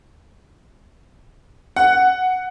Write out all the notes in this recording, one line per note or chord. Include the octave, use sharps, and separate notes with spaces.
F#5